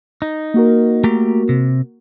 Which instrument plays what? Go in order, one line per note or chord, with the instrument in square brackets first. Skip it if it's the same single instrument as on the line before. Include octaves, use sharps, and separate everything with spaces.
[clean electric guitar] D#4
[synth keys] A#3 F#4 A#4
[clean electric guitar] A3 G4 A#5
C3